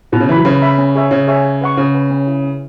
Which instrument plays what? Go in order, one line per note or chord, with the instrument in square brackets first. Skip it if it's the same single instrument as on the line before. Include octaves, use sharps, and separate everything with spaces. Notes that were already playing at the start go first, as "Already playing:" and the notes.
[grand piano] B2 [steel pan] B4
[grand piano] C#3
[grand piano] E3 [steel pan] E5 B5
[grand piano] F#3
[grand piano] C#3 [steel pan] B4
[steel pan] E5 B5
C#4
G#4 C#5 E5 G#5
[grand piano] C#3 [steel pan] C#4
[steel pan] G#4 C#5 E5 G#5
G#4
B4 F#5 C#6
[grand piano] C#3 [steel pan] G#4
[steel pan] B4 F#5 C#6
C#4
E4 G#4
C#4